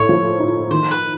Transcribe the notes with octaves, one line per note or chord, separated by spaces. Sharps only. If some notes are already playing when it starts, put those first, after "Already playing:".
Already playing: A2 C#5
F3
D#4
D#3 C5
B4